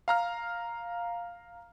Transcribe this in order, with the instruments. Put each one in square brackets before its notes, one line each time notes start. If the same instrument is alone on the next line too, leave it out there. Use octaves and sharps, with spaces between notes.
[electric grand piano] F5 A#5 F6